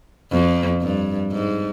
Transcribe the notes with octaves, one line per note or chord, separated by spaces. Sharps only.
F2
G2
G#2